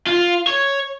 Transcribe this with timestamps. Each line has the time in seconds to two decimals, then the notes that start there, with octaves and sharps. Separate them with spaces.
0.07 F4
0.47 C#5